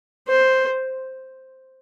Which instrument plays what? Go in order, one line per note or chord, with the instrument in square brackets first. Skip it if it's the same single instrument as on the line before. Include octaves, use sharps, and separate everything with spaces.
[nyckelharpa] C5